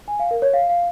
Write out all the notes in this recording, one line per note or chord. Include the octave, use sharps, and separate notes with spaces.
G#5
F5
A#4
C#5
F5
F5